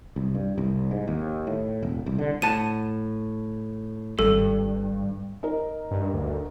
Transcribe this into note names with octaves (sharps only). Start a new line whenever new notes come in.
C2
G2
C2
G#2
D#2
A2
E1
C2
D3
A2 F#5 A5 D#7
G#1 G2 A4
D#4 A#4
G2
D2